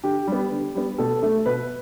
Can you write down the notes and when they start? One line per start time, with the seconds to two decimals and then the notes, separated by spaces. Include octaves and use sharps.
0.04 D3 G4
0.27 G3 B3
0.51 D3
0.75 G3 B3
0.98 B2 A4
1.22 A3
1.46 B2 B4